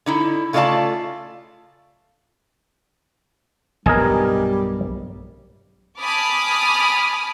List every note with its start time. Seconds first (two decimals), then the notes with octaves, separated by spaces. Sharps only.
0.06 D3 D#4 E4
0.53 C#3 A3 D4 F4 D5 A5
3.86 B1 G2 G3 A#4 D#5 G#5
6.00 G#5 A5 B5 D6 D#6 F6